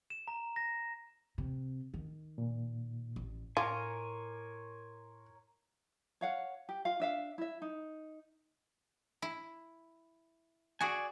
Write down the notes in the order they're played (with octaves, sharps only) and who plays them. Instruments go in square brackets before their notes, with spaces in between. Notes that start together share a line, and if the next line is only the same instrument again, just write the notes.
[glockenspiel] E7
A#5
A#6
[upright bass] C3
D#3
[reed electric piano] A#2
[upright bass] A1
[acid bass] A2 [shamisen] F4 [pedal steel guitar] A#4 C#5 G#5 [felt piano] C6 D6
[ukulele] C#5 F5 F#5
G4
F4 F5
D4 E5 F5
E4 E5
D#4
[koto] E4
[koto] F#4 G#4 [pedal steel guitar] D5 G#5